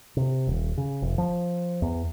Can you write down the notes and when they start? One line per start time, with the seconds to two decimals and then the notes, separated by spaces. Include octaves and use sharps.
0.17 C3
0.47 D#1
0.77 C#3
1.02 F1
1.18 F3
1.82 E2